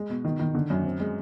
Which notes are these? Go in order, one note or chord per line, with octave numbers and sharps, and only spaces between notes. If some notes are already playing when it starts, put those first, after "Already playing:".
Already playing: G#3
B2
D#3
D#3
D3
F#2
C4
G#3